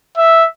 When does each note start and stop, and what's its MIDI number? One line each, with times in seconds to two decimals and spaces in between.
0.17 0.45 76